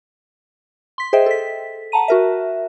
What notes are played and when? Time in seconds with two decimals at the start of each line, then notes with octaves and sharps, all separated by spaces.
0.98 C6 B6
1.13 G#4 C5 D#5 E5 G5
1.26 A4 B6
1.92 F#5 A5 A#5 D#7
2.08 F#4 A#4 E5